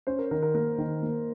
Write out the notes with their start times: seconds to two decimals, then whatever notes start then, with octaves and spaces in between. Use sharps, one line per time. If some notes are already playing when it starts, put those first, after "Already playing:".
0.07 C#4 C5
0.19 A#4
0.31 D#3 A#4
0.42 A#4
0.54 A#3 A#4
0.78 D#3
1.02 A#3